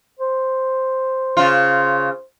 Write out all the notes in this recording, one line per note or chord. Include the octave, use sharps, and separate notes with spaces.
C5
C#3 F4